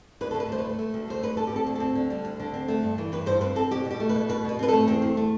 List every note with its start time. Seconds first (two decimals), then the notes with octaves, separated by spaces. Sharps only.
0.21 D2 B4
0.31 A4
0.35 D2
0.40 B4
0.49 A3 C5
0.59 B4
0.64 A3
0.79 A3
0.94 D2
1.08 A3 C5
1.22 D2 B4
1.37 D2 A4
1.47 G4
1.52 C4 A4
1.67 D2
1.75 C4 A4
1.95 D3
2.10 G3
2.25 D2
2.40 D3
2.54 C4
2.68 A3
2.83 G2
2.98 E3
3.12 G2 B4
3.26 G2 C5
3.41 C4 B4
3.55 C4 A4
3.71 B2 G4
3.85 B2
3.90 G4
4.00 A3
4.09 B4
4.14 B2
4.29 B2 B4
4.44 B2 B4
4.59 C4 B4
4.68 A4
4.73 A3
4.87 E2 C4
5.02 E2
5.17 A3